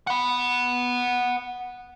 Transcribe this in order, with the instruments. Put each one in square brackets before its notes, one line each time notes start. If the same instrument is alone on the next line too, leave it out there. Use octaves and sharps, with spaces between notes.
[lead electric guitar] F#5 B5